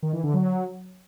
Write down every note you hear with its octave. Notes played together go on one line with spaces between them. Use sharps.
D#3
E3
D3
F#3